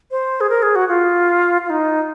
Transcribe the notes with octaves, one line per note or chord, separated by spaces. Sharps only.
C5
G#4
A#4
G#4
F#4
F4
F4
D#4